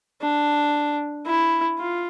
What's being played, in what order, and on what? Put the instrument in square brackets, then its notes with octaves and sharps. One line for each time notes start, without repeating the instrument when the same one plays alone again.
[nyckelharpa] D4
E4
F4